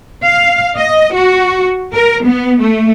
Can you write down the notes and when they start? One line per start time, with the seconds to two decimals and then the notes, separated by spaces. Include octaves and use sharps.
0.24 F5
0.77 D#5
1.14 F#4
1.95 A#4
2.25 B3
2.61 A3